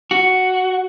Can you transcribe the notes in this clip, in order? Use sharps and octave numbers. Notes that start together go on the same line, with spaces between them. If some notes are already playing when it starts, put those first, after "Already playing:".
F#4